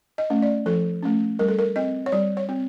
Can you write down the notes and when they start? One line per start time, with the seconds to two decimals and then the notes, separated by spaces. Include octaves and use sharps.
0.18 D#5
0.30 A3 C#4
0.42 D5
0.66 F3 A4
1.03 A3 C#4
1.39 G3 A#4
1.48 A4
1.58 A#4
1.76 C4 D#5
2.06 C#5
2.12 G3 D5
2.37 C#5
2.49 C4